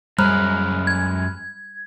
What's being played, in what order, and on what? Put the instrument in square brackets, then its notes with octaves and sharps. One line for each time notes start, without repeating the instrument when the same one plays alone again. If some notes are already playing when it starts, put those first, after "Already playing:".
[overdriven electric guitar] F#2 G#3 [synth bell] G3 [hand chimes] B5 F6 F#6
[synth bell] G#6